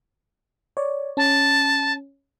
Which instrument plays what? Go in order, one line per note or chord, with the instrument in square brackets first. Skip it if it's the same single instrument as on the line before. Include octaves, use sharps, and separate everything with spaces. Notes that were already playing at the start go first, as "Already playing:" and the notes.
[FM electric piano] C#5 D5
[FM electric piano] C#4 [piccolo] A5